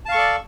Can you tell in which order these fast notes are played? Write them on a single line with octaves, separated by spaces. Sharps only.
A5 F5 C#6 A4 D5